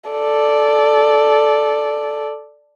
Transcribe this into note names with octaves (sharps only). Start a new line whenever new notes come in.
A4 D5